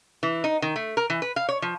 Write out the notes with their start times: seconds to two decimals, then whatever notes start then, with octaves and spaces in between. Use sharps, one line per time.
0.23 E3
0.44 D#4
0.62 D#3
0.76 A3
0.97 A#4
1.10 E3
1.22 B4
1.36 F5
1.49 C#5
1.62 F3